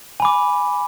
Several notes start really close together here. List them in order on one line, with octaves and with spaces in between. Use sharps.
G#5 B5 D6